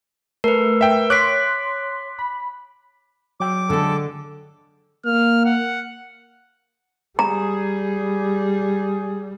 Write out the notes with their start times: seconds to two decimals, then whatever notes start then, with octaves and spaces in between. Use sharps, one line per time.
0.44 A3 A#4 B4
0.81 E5 G5
1.10 C#5 C6 D6 F#6 B6 D7
2.19 B5
3.40 F#3 G5 D6 E6
3.70 D3 G#3 D4 A4
5.05 A#3 F6
5.45 F#5
7.19 G3 G#4 A#5